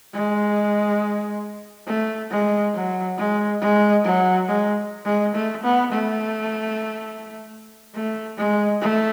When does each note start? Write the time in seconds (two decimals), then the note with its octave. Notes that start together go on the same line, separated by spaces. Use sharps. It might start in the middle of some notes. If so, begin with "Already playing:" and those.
0.14 G#3
1.87 A3
2.31 G#3
2.74 F#3
3.17 G#3
3.61 G#3
4.04 F#3
4.48 G#3
5.05 G#3
5.35 A3
5.63 B3
5.92 A3
7.95 A3
8.38 G#3
8.82 A3